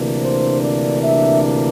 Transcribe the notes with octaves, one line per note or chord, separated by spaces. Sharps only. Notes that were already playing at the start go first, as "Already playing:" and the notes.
Already playing: D2 C3 E3 A#3 D4
C5
D5
E5